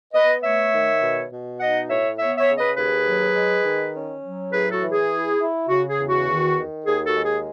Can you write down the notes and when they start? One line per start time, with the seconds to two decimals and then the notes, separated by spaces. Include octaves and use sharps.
0.14 B3 B4 D#5
0.43 A3 C#5 E5
0.72 D#3
1.02 B2
1.31 B2
1.60 D#4 D#5 F#5
1.90 A2 C#5 E5
2.19 B3 C#5 E5
2.38 C#5 E5
2.49 C#3
2.58 B4 D#5
2.77 D#2 G#4 B4
3.07 F#3
3.35 G#3
3.65 D#3
3.95 C#4
4.23 F#3
4.52 A2 G#4 B4
4.72 F#4 A4
4.81 E3
4.92 G#4
5.11 E4
5.40 E4
5.69 C#3 F#4
5.89 G#4
5.99 E2
6.09 F#4
6.28 D#3
6.58 D#3
6.86 D#2 G#4
7.06 F#4 A4
7.15 G#3
7.25 G#4